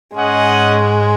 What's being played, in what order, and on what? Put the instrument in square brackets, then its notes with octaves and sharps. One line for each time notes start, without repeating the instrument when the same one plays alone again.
[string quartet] G#2 G#3 [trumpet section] C#4 G#4 D#5 F#5